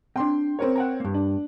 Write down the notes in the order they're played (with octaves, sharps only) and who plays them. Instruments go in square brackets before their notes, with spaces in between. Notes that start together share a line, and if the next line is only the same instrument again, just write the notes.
[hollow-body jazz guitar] C4 D4 [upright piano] G5 C6
[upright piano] C4 A#4 C#5
[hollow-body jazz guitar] F#5 G5 A#5
G2 A#3
[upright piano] D4